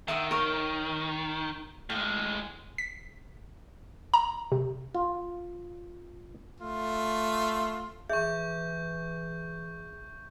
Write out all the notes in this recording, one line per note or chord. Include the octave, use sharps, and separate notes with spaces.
D#3 E5 F#5 D#6
A#4 C#5 F5
A2 G#3 F5
B6
A#5
C3
F4
A3 F4
E3 G#4 E5 C#6 G6